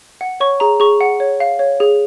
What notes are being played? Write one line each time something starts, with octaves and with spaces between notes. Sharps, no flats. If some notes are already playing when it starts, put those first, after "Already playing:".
F#5
C#5 C#6
G#4 A#5
G#4 C#6
F#5
C#5
F5
C#5
G#4